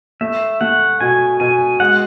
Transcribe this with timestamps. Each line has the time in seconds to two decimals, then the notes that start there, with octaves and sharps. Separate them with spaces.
0.21 A3 E5
0.61 A3 F#5
1.00 B2 G#5
1.40 B2 G#5
1.80 G#3 F#5